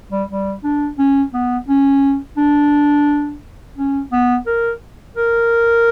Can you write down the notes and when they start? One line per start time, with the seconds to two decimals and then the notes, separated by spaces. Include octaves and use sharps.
0.11 G3
0.29 G3
0.63 D4
0.98 C#4
1.33 B3
1.68 C#4
2.37 D4
3.77 C#4
4.12 B3
4.46 A#4
5.16 A#4